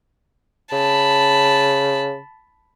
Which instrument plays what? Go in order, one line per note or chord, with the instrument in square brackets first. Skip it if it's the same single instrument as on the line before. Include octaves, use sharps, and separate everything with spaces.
[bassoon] C#3 [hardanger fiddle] A5 B5